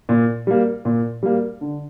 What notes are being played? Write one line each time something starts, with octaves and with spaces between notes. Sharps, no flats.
A#2
G3 A#3
A#2
G3 A#3
D3